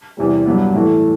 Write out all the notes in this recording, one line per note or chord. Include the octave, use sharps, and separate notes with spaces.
E2 C3 G3
G2 F#3 B3
A2 E3 A3